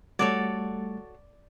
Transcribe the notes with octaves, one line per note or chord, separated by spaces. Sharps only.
G3 A3 F#4 A4 C#5 D5